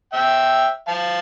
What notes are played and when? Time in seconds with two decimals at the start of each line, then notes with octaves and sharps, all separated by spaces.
0.13 E5 G5
0.88 F5 A5